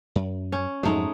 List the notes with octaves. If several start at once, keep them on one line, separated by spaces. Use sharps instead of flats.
F#2
C#4
F2 G#2 F#3 G#3 A3 D#4